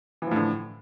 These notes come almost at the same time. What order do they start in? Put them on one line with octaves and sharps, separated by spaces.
E3 F3 A2 D3